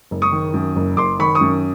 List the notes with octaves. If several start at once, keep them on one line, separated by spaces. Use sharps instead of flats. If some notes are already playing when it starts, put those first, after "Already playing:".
F#1
C#6 D#6
D#3
F#2
F#1
F#1 C6 D6
D#3 B5 C#6
C#6 D#6
F#2